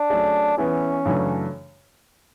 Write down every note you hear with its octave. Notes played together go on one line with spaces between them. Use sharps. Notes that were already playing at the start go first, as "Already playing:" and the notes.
Already playing: D4
F#3 A3 C#4 G#4 D5
E3 B3 C#4 E4 G#4
F#2 C#3 E3 A3 D4